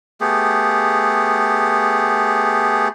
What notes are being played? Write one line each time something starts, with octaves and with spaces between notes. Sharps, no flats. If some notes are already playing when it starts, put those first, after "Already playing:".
A3 B3 G4 G#4